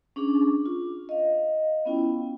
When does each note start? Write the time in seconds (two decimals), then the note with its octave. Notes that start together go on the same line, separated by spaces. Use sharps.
0.16 C#4 D4 G#4 C#6 D6
0.66 F4
1.09 D#5 F5
1.85 B3 C#4 E4 F4 G5